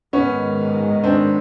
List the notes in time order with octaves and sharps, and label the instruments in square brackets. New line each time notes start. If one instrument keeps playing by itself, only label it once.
[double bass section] G#2 D#3 G#3 [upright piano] B3 C#4
[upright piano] C4 D4